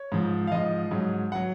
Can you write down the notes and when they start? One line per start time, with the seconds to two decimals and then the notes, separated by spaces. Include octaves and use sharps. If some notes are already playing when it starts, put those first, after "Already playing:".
Already playing: C#5
0.12 G#2 F3
0.47 F5
0.52 G#2 F3 D#5
0.91 G#2 F#3
1.32 F#3 F#5